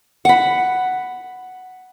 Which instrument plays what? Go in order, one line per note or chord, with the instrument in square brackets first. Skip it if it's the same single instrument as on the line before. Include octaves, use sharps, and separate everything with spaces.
[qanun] F#5 B5